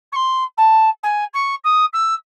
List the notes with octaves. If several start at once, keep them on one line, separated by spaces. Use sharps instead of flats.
C#6
C6
A5
G#5
C#6
D#6
E6